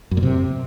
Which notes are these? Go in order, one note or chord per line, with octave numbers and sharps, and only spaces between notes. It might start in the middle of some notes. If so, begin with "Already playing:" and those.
F#2
A#2
C3